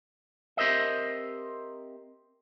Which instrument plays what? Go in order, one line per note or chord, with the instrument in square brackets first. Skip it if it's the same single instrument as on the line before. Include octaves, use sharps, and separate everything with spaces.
[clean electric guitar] C4 G4 A#4 C5 D#5 E5